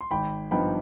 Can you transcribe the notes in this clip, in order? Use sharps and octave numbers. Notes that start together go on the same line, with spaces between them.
C6
G#1 G5 B5
G2 F3 B3 D#4 G5 B5